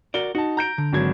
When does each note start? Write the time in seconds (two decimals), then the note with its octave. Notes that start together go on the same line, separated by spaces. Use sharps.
0.14 F#4 A#4 D5 G7
0.35 D#4 F#4 A5
0.57 A#5 G6 D7
0.78 D3
0.93 G#1 F#3 G#6